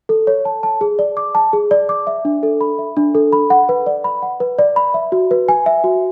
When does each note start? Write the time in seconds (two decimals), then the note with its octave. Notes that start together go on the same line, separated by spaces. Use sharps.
0.09 A4
0.27 C#5
0.45 A5
0.63 A5
0.81 G#4
0.99 D5
1.17 D6
1.35 A5
1.53 G#4
1.71 D5
1.89 D6
2.07 E5
2.25 D4
2.43 A4
2.61 B5
2.79 E5
2.97 D4
3.15 A4
3.33 B5
3.50 F#5
3.69 B4
3.86 D5
4.04 B5
4.22 F#5
4.40 B4
4.59 D5
4.76 B5
4.94 E5
5.12 F#4
5.31 B4
5.48 G#5
5.66 E5
5.84 F#4